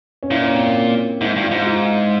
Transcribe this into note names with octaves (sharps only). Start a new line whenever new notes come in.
C#4
A#2 E4
C#4
C4
A#3
G#2 E4
G2
F4
G#2
F4